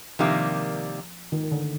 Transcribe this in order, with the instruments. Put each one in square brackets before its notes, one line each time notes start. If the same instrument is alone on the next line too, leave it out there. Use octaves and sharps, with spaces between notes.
[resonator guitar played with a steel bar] C3 D#3 G3 A#3 [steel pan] F3
[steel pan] D#3
D3